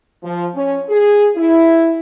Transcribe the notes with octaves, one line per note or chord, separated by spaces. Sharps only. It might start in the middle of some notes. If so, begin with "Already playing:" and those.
F3
C#4
G#4
E4